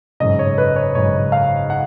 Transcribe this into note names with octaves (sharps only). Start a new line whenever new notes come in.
G#1 F#2 C#3 D#5
C#5
B4
C#5
G#1 F#2 C#3 C#5
F5
F#5